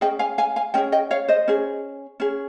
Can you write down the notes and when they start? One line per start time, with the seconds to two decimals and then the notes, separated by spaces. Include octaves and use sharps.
0.01 C#4 G#4 D#5 G5
0.19 F5 G#5
0.38 F5 G#5
0.56 F5 G#5
0.74 C#4 G#4 D#5 G5
0.92 D#5 G5
1.11 C#5 F5
1.28 C5 D#5
1.48 C#4 G#4
2.20 C#4 G#4